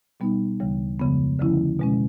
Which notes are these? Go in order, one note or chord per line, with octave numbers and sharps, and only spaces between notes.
B2 G3 B3 D#4
D2 C#3 E3 G3
F2 C#3 F3 G#3 B3
D3 F3 A3 C#4 E4
B2 G#3 C#4